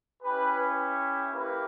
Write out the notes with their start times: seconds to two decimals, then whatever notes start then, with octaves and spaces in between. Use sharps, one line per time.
0.22 C#4 E4 G4 B4
1.34 A#3 E4 G4 B4